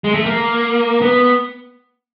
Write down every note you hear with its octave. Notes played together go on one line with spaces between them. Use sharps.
G#3
A3
A#3
B3